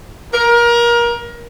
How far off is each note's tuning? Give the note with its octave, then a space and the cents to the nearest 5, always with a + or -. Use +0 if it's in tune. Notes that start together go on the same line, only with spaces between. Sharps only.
A#4 +25